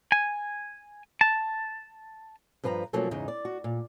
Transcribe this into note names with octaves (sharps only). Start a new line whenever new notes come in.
G#5
A5
G2 F3 B4 A5 A#5
B2 F3 F#3 A3 A#3 C#4
E2 G#2 C#3 D#4
D5
F#4
A#2